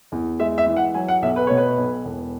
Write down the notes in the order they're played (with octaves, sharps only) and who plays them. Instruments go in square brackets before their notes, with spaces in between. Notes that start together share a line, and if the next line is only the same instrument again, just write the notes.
[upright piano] E2
G#3 E5
E5
E3
F#5
F#3 G#5
F#5
B1 E5
B4
B2 C#5
B4
B1
E1